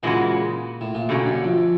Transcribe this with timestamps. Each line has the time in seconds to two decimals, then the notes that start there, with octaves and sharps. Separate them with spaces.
0.03 A#2 C#3 E3 G#3 C#4 F#4
0.81 A2
0.94 A#2
1.09 B2 D3 G3 A#3 C#4
1.26 F#2
1.44 F2